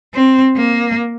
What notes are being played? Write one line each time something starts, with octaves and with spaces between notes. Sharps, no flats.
C4
A#3